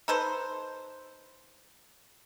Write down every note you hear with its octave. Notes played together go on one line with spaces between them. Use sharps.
D#4 A4 B4 C5